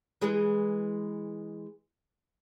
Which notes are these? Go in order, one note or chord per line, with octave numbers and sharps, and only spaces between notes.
E3 G#3 G#4